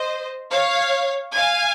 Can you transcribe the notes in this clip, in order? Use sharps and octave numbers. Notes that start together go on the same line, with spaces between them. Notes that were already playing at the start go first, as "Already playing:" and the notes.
Already playing: C5 D#5
C#5 F5
F5 G#5